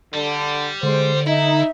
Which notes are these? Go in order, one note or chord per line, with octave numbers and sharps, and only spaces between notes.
D3 G3
D3 G#3 C5
D#4 E4 E5